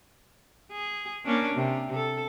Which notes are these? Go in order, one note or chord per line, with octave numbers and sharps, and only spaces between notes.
G#4
A#3 C#4 D4
C3
A4